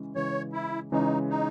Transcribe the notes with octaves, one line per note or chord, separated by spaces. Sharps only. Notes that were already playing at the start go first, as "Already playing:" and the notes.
Already playing: C#3 E3 G#3 C#4
C#3 E3 G#3 C#4 C#5
E4
C#3 E3 G#3 C#4 D#4
D#4